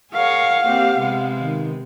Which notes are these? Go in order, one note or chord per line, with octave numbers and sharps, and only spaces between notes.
G#4 A#4 C#5 F5 F#5
A#3 C4 G4
C3 G#3 B3
D#3